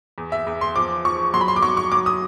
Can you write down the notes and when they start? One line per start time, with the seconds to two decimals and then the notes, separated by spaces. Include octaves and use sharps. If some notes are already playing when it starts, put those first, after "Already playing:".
0.18 E2
0.32 E5
0.47 E2
0.61 C6
0.76 F3 D6
1.05 F3 C#6
1.34 F#3 C6
1.41 B5
1.48 C6
1.56 D6
1.62 F#3 C#6
1.77 C#6
1.92 F#3 D6
2.06 D#6